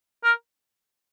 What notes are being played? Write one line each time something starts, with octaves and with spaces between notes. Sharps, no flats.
A#4